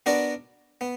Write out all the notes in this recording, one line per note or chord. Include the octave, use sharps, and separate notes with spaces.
B3 D4 F#4 A#4 D5
B3